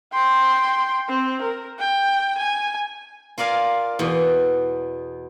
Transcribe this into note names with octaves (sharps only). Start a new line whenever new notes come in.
G5 C6
C4
A#4
G5
G#5
F4 A#4 D5 F5 G#5
E2 B2